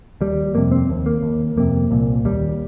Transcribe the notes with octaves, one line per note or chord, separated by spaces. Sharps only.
D#2 G3
F2 C3 A#3
C4
D#2
A#3
D#2
F2 C3 A#3
C2 A#2
D#2 G3